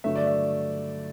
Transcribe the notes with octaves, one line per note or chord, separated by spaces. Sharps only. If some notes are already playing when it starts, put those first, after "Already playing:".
G2 D3 F#3 A3 E5
D5
E5